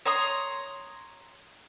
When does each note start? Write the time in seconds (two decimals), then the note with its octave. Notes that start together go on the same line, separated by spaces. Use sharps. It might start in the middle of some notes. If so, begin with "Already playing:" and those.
0.06 C#5 A#5 C6 D#6